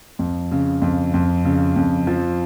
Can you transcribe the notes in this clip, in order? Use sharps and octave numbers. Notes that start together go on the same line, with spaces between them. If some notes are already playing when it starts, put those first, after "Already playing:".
F2
C#3
F2
F2
C#3
F2
F3